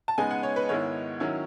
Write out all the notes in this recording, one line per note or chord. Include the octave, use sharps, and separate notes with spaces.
A5
C#3 G#3 B3 D#4 G#5
F#5
C#5
B4
G#2 D#3 G#3 B3 E4 C#5
D#3 F#3 C#4 E4